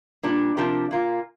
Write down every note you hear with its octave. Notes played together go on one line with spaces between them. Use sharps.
A#2 G3 D4
C3 F3 D4 G4 A#4
A#2 A#3 F4